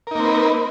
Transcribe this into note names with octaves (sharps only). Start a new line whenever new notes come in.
A#3 C4 D#4 A#4 B4